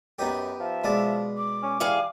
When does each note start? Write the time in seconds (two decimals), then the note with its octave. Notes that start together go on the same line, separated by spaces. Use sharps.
0.19 F#2 B3 D#4 G4
0.60 F3 E5
0.84 B2 G#3 D5
1.37 D6
1.63 C#4
1.80 E3 G3 G#4 F5